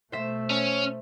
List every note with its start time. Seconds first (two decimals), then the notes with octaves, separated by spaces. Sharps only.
0.12 B2 A3 C5 E5
0.50 C#4